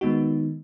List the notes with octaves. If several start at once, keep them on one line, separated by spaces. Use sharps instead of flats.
D#3 G#3 B3 D#4 F#4